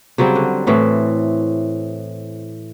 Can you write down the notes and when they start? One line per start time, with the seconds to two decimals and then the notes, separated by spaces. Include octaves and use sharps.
0.18 C#3 F#3 G3 C4
0.35 D3
0.67 A2 E3 C4